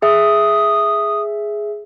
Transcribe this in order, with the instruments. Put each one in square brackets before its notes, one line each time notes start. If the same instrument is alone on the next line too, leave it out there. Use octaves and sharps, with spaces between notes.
[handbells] G#4 E5 [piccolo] D#6